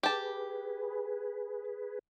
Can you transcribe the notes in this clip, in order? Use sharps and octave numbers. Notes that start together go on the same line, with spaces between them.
G4 G#4 B4 A5